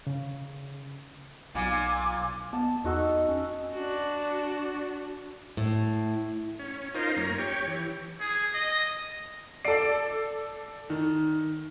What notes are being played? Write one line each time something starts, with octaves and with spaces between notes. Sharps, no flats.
C#3
B1 A#2 G#5 D6
B3 A5
E2 D#4 F#4 A4
C#4
D4 F#4
A2
C#4
D#4 F4 A#4 C5
F#2 A#3 C#4 A#5
G4 C#5
E3
G#4
D#5
A4 D5 C7 D7
D#3